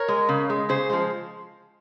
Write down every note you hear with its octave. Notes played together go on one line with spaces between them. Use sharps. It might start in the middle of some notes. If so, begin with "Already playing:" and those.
Already playing: A#4 C#5
G#3
C#3
G#3
C#3 G#4 C5
F3 G#3